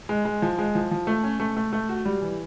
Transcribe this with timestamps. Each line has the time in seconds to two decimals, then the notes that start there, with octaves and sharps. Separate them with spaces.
0.09 G#3
0.25 G#3
0.42 F3
0.58 G#3
0.75 F3
0.91 F3
1.07 A3
1.23 C#4
1.40 A3
1.57 A3
1.73 A3
1.89 F#4
2.05 G3
2.21 E3